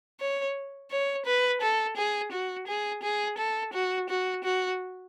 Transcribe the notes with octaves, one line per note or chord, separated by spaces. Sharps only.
C#5
C#5
B4
A4
G#4
F#4
G#4
G#4
A4
F#4
F#4
F#4